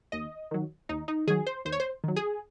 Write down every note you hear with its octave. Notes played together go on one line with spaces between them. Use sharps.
D#2 D#5
D#3 F#3
D#2 D#4
D#4
D#3 F#3 G#4
C5
D#2 C5
C#5
C5
D#3 F#3
G#4